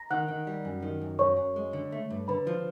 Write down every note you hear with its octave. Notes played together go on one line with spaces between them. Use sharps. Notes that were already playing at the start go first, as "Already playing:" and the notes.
Already playing: A#5 A#6
D#3 F#5 F#6
D#3
G3
F#2
D#3
F#2
F#2 C#5 C#6
F#2
G#3
D3
A3
G2
D3 B4 B5
F3